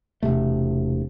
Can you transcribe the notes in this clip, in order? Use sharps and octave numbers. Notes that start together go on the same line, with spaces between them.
E1 C3 A3